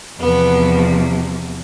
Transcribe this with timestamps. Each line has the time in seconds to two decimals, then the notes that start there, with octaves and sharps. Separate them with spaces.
0.19 E2 C3 F3 B3